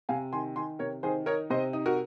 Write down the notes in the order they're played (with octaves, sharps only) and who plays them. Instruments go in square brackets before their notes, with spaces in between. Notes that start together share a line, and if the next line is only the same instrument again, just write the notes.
[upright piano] C3 F5 G#5
D#3 G#5 C6
D#3 G#5 C6
C3 A#4 C#5
D#3 G#4 C5
D#4 A#4 C#5
C3 C5 D#5
D#4
F#4 A#4